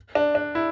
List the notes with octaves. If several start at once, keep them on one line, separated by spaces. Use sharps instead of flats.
D4
D4
E4